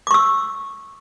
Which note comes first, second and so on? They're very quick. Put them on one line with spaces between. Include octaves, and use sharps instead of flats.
D6 C#6 E6